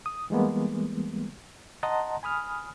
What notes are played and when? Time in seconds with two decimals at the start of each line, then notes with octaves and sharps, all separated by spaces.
0.06 D#6
0.30 E3 G3 G#3 A#3 B3
1.83 D#5 F#5 A5 A#5 C6
2.23 G#5 B5 D#6 F6